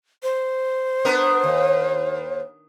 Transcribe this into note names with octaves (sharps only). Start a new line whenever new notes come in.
C5
B3 D4 A#4
D#2